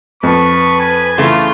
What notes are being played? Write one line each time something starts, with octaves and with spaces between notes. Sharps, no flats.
F2 B4 C#6
G#5
C#3 E3 A3 F4 C6